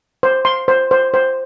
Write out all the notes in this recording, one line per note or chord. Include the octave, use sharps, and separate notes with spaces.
C5
C6
C5
C5
C5